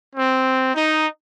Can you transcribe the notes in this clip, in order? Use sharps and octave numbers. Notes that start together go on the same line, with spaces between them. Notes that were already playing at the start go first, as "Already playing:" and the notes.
C4
D#4